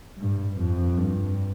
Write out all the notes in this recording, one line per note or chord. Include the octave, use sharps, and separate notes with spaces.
G2
F2
G2